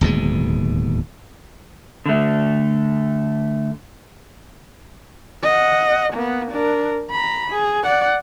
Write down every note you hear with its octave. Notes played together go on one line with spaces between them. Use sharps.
D1 D#2 B2 G#3
D3 A3
D#5 F#5
A#3 B3
D4 A#4
A#5 B5
G#4
D5 F#5